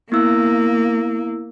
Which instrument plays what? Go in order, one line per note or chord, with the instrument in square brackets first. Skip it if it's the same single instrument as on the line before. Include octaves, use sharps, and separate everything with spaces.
[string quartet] A#3 [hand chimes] B3 E4 E6